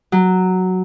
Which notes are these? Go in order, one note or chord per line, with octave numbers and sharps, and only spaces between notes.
F#3